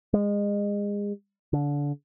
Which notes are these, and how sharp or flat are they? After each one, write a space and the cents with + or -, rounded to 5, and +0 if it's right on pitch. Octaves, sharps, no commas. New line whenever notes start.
G#3 -30
D3 -25